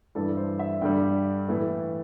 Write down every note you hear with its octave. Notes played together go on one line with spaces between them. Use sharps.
G2 E3 G3 A4
C5
E5
G2 D3 G3 G5
A2 E3 A3